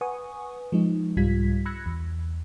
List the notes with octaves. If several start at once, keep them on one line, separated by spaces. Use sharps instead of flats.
B4 F#5 G#5 C#6 D#6
F3 G#3 D#4
C2 G#2 G3 F4 G#6 B6
B5 E6 F#6 G#6 A#6 C#7
E2